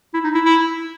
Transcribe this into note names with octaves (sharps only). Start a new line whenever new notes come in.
E4
D#4
E4
E4